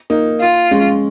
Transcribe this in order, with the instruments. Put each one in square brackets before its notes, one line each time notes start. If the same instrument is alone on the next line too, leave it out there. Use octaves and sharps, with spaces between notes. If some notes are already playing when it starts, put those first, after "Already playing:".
[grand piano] A#3 D#4
[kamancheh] F4
[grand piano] G#3 C#4